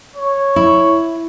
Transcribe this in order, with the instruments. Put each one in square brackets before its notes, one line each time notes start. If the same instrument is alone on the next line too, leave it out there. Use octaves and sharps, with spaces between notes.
[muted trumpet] C#5
[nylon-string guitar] E4